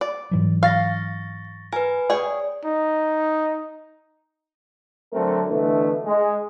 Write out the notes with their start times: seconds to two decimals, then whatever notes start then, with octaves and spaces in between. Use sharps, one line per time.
0.01 D5
0.31 G#2 E3 F#3
0.63 F5 C#6 A6 A#6
1.73 A#4 B4 G#5
2.10 G#4 C#5 D5 G5
2.65 D#4
5.13 D3 F#3 A3 C4 A4 A#4
5.49 B2 D3 E3 A3 D4
6.05 G#3